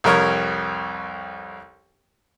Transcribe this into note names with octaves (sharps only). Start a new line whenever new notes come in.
C2 F2 A#4 C#5